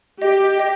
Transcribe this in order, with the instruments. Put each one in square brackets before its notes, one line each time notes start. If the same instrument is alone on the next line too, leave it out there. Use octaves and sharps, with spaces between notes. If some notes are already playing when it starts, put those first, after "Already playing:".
[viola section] G4 [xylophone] D#5
[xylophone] D#5